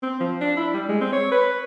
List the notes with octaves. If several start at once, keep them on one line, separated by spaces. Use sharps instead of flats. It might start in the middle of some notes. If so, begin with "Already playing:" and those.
C4
F3
D4
E4
G3
G#3
C4
C#5
B4